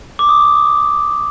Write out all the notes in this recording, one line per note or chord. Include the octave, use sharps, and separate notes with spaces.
D6
D#6